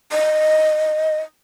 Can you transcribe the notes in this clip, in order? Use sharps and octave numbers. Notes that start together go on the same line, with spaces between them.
D#5